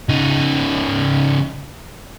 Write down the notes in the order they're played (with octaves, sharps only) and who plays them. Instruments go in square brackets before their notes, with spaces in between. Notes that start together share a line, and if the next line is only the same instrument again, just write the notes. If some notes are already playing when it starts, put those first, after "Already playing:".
[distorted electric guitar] C#3 D#4